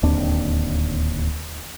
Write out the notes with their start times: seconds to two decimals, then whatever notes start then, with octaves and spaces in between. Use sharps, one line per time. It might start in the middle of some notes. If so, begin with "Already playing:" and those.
0.03 D1 D#2 C4 D4